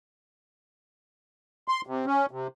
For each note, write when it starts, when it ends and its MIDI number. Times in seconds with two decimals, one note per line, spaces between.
1.68 1.81 84
1.87 2.05 48
2.06 2.26 61
2.31 2.47 48